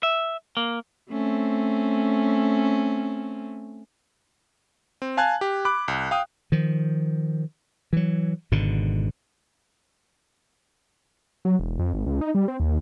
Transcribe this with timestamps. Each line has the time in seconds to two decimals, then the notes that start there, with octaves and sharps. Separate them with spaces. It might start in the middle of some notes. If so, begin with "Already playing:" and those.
0.03 E5
0.57 A#3
1.11 A3 C4 C#4
5.02 C4
5.17 F5 G#5 A5 F#6 G#6
5.41 G4
5.65 B5 D6 F#6
5.88 C2
6.11 F5 G5 D#6
6.52 D#3 F3
7.93 E3 F#3
8.51 G#1 G#2 B2 D3
11.45 F#3
11.59 E1
11.79 F2
11.94 G#1
12.06 C#2
12.21 D#4
12.35 G3
12.48 C4
12.60 D#2